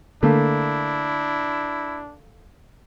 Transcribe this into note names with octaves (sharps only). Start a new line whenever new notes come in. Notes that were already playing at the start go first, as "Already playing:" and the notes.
D3 A3 A#3 D4 E4